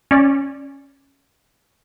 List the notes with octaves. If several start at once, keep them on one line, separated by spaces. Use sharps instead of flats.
C#4 D5